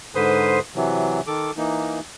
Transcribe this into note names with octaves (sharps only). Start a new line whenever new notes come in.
G#2 D3 B4 C5 C6 D#6
C3 E3 F#3
D#3 A4 D6
E3 A#3 D#4